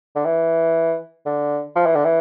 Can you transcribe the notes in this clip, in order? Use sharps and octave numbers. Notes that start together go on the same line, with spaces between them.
D3
E3
D3
F3
E3
D3
E3